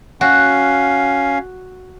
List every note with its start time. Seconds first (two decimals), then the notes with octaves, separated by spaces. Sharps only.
0.21 C#4 F#4 F5